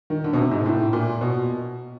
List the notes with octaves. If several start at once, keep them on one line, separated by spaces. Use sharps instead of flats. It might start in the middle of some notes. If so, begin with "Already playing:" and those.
D#3
D3
B2
C3
G#2
A2
A#2
B2